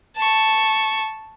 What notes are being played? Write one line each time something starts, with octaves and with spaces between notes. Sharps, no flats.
A5 C#6